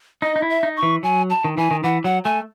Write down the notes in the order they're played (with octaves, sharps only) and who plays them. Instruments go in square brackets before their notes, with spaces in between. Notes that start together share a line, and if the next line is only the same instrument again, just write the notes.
[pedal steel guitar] D#4 [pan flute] D#5
[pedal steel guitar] D#4
E4
[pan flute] E5
[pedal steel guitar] D#4
[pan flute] C#6
[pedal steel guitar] E3
[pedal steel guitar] F#3 [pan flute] G#5
[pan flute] A5
[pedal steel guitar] D#3
[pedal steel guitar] E3 [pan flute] G#5
[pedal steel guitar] D#3
[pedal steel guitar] E3 [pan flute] F#5
[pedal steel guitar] F#3 [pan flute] F#5
[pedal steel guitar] A3 [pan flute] G#5